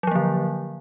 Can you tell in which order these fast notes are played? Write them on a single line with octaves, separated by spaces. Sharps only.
F#3 F3 A#3 D3